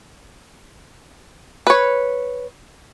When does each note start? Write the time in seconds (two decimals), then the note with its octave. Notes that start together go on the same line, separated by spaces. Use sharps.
1.67 B4 C#5